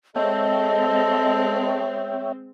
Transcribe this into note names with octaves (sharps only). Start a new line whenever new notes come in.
G#3 C4 A4 C#5 D#5 E5 G5